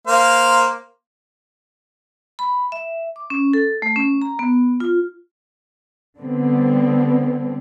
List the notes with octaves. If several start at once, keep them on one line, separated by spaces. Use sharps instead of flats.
A#3 C5 F5
B5
E5
D6
C#4
A4
A3
C#4
A#5
B3
F4
D3 G3 B3 C4